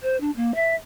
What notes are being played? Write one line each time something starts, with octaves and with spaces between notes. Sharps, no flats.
C5
D4
A#3
E5